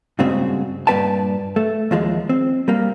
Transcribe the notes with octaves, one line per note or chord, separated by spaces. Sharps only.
G2 A#2 C#3 G#3 C4 F#4
G2 A#2 A3 B4 G5 A5
A3
D#2 F3 G#3
C4
G3 A#3